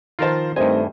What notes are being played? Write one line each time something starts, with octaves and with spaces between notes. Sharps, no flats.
D#3 F3 F4 A#4 C5 A5
G2 D#3 A3 C4 G4 C5 D#5 G#5